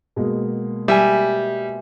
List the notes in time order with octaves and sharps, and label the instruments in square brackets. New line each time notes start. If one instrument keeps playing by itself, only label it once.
[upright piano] B2 G#3 A#3
[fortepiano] G3 [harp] E5 G#5